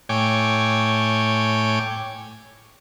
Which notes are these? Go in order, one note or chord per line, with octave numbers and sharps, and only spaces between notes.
A2 C#5 G5 G#5 D6